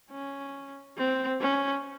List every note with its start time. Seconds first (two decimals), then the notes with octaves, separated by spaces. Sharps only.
0.11 C#4
0.97 C4
1.40 C#4